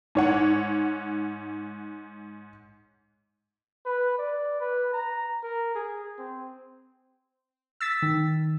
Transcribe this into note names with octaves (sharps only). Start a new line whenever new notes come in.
G#2 C#5 F#5
B4
D5
B4
A#5
A#4
G#4
C4
E6 A6 B6
D#3